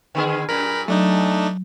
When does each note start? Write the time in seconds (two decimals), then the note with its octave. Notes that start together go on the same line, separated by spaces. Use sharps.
0.15 D3 B3 G#4
0.49 F#2 A#2 A#4 B5
0.88 F#3 A3 D4 D#4